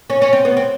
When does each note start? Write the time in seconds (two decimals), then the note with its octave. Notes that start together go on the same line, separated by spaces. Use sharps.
0.10 C#4
0.22 C#4
0.33 C4
0.45 B3
0.57 C4